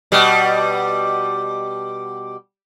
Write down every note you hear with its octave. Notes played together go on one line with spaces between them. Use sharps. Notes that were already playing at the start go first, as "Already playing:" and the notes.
B2 G3